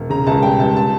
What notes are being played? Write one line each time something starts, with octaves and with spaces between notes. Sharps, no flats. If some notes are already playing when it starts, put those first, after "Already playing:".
Already playing: E1
C#3 A#5
C#2 A5
G3 G5
C#2 A5
A5